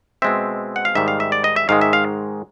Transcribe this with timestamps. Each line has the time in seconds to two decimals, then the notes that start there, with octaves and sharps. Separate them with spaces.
0.22 B2 G#3 C4 E5
0.76 F#5
0.85 F5
0.95 G#2 D#3 G3 E5
1.08 F5
1.20 E5
1.32 D5
1.44 D#5
1.56 E5
1.69 G#2 D#3 G#3 F5
1.81 E5
1.93 F5